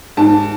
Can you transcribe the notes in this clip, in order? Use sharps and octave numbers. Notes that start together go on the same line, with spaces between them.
G#2 A5